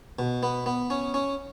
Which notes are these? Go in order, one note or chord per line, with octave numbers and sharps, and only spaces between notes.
B2
B3
B3
C#4
C#4